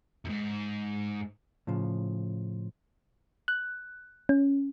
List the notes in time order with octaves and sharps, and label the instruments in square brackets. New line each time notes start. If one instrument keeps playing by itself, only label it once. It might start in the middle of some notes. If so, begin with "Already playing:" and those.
[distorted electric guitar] F2 G#2
[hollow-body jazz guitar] A2 C#3 F3
[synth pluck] F#6
C#4